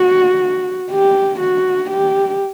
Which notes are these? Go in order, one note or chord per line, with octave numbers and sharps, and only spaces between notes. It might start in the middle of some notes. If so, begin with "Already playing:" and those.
Already playing: F#4
G4
F#4
G4